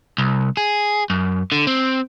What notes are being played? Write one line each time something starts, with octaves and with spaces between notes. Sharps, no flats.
C2
G#4
F#2
D3
C4